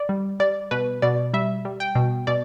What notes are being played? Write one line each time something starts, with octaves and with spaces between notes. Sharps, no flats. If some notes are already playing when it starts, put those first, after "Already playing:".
Already playing: D5
G3
G3 D5
B2 B4
B2 D5
G3 E5
G3
G5
B2
B2 D5